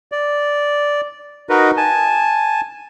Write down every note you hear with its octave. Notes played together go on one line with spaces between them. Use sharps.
D5
D#4 F#4 A#4 B4 D#5
G#5 A5